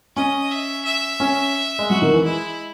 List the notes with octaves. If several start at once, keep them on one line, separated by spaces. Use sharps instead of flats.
C#4 D#5
E5
E5
C#4
G#3
F#3 F#4
D#3
E3
G#3 E4